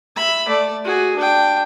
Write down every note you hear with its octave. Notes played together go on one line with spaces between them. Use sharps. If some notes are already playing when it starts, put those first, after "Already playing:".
E5 B5
A3 D5
F#4 G#4
D4 G5